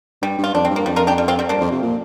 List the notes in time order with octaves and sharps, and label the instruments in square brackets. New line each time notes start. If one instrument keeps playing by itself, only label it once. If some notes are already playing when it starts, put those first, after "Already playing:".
[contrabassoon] G2 [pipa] G3
[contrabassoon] G2
[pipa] F4
[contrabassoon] F2 [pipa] D4
[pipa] C4
[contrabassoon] G2
[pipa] A#3
[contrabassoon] F2 [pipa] G3
[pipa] F4 A#4
D4 G4
G3
C4 F4
G3 C4
[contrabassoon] G2 [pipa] A#3 D4
[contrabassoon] F2
C3
A#2